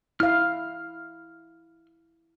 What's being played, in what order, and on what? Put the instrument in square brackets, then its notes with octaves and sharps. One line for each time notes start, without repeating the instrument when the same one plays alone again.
[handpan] E4 F5 [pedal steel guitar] F6